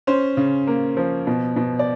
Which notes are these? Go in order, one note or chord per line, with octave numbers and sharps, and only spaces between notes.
C#4 C5
C#3
A#3
F3
B2
B2
D5